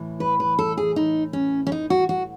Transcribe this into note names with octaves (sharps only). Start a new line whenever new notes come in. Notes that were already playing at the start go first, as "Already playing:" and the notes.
Already playing: A2 E3
B4
B4
A4
G#4
D#4
C#4
C#4
D#4
F#4
F#4